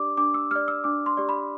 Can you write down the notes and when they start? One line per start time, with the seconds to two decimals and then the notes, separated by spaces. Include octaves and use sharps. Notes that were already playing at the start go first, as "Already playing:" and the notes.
Already playing: D4 G4 D5 D6
0.17 D4 D6
0.34 E6
0.51 G4 D5 F6
0.68 E6
0.84 D4 D6
1.06 C6
1.17 G4 D5
1.29 B5